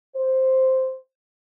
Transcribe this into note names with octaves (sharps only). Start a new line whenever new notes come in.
C5